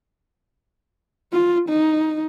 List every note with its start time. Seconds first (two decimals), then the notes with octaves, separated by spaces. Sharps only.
1.33 F4
1.69 D#4